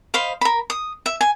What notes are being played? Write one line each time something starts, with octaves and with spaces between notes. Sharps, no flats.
C5 D#5 F5 B5
A#4 B5
D#6
E5
G#5